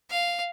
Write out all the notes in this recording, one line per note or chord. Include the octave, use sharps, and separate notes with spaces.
F5